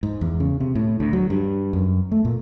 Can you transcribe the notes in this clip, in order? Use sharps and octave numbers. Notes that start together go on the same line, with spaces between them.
G#2
E2
C#3
C3
A2
D2
F#3
G2
F#2
A3
A#2